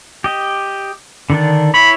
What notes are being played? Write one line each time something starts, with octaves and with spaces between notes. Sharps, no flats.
G4 D#5
D3 D#3 D4
E4 C#5 B5